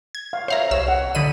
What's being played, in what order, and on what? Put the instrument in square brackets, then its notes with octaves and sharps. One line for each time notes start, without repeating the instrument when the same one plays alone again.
[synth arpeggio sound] G#6
[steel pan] F5
[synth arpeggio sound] C5 F5 A#5 [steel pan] C#5 E5
[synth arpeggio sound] C2 E6 [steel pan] C#5 D#5
[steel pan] F#5
[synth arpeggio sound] D3 B5 D#7 [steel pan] D#5